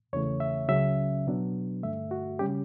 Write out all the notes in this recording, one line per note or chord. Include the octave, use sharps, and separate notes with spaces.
E2 C#3 E3 A3 C#5
E5
C#2 C#3 F#3 C#4 E5
B2 F#3 B3 D4
G2 D3 A3 E5
F#4
C#3 G3 C#4 G4